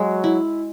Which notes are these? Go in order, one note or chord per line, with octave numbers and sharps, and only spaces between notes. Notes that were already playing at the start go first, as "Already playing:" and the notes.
Already playing: F#3 G#3 F#4
E4